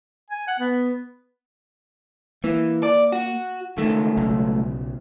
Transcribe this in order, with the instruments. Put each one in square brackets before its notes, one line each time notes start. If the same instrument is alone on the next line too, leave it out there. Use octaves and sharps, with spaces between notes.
[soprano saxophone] G#5
F#5
B3
[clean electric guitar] E3 [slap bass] A#3
[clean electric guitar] D5
F#4
[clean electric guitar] C#2 A3 [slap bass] D#3
[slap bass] B1 C#3 F#3